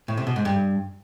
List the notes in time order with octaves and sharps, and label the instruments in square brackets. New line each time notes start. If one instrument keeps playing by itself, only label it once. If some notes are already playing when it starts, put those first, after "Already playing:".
[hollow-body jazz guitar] A2
C3
B2
G#2
G2